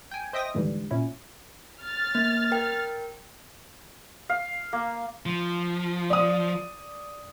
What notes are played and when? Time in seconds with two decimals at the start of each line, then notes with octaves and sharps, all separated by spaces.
0.11 G5 G#5
0.33 C5 D#5 E5 G5 D#6 A#6
0.54 D#2 G#2 D3 E3 G3
0.91 A#2 C#4 E4
1.81 F6 A6
2.15 A#3
2.52 A#4 G5
4.29 F5
4.73 A#3
5.26 F3
6.10 D5 D#6